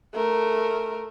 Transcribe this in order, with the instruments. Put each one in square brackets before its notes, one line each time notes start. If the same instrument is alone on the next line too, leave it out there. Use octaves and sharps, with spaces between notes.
[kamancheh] A3 A#4